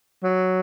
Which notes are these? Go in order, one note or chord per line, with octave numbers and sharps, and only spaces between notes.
F#3